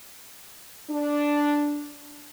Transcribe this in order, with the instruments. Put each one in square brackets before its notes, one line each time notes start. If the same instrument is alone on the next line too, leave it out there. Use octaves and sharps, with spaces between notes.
[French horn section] D4